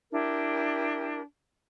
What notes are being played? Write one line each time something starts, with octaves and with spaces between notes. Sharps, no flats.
D4 E4 G4 A#4